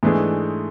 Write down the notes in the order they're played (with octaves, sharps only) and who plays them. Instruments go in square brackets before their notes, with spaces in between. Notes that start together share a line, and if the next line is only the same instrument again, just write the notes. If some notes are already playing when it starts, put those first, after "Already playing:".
[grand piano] G#2 E3 A3 D4 G#4